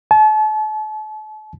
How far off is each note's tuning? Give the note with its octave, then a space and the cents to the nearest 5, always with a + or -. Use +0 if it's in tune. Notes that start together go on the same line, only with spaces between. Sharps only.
A5 -40